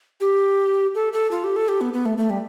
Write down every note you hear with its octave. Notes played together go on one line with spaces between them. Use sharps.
G4
A4
A4
F4
G4
A4
G4
B3
B3
A3
A3
G3